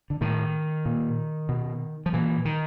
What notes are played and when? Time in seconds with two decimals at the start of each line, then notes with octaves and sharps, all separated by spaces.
0.10 D3
0.21 A2 D#3
0.86 A#2
1.49 B2
2.06 F3
2.13 A#2 E3
2.45 D#3